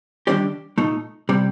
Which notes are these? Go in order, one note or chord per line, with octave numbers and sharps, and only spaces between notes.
D#3 G3 D4 G4 D5
A#2 A3 D#4
C3 G3